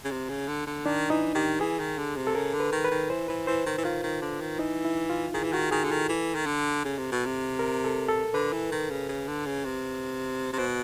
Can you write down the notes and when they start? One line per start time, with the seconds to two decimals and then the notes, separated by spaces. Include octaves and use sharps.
0.05 C#3
0.11 C3
0.29 C#3
0.48 D3
0.67 D3
0.86 D#3 D4
1.10 E3 D#4
1.35 D#3 G4
1.60 E3 G#4
1.80 D#3
1.98 D3
2.16 C3
2.27 A4
2.35 C#3 A#4
2.54 D3
2.60 B4
2.72 D#3
2.85 B4
2.91 D#3
3.10 E3 C5
3.28 E3 B4
3.47 E3 C5
3.66 D#3
3.78 E3
3.85 D#3 F4
4.03 D#3
4.22 D3
4.41 D#3
4.59 E3 D#4
4.85 E4
5.10 F4
5.34 D#3 G#4
5.44 E3
5.53 D#3 F#4
5.71 D#3 G#4
5.84 D3
5.91 D#3 A4
6.09 E3
6.35 D#3
6.46 D3
6.85 C#3
6.98 C3
7.12 B2
7.26 C3
7.59 A#4
7.84 A4
8.08 A4
8.34 D3 B4
8.53 E3
8.72 D#3
8.90 C#3
9.09 C#3
9.28 D3
9.46 C#3
9.65 C3
10.53 C3
10.58 B2 C5